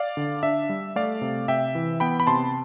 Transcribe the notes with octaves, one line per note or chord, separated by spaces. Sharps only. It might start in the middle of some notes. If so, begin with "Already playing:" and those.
Already playing: D5 F5
D3
D4 E5
G3
A3 D5 F5
C3
C3 E5 G5
E3
B3 G5 B5
B5
C3 A5 C6